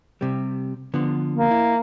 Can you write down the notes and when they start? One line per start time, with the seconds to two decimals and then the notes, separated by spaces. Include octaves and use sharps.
0.21 C3 G3
0.94 D3 F3 B3
1.35 A#3
1.51 E4